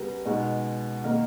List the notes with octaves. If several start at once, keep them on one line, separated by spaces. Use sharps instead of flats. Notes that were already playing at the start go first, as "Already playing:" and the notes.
Already playing: C#3 G3 B3 G4 A#4
B2 G#3 D#4
D#3 A#3 D#4 A#4